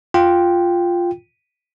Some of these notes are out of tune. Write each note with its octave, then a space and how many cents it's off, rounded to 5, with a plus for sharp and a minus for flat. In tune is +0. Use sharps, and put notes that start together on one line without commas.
F4 +0 G5 +0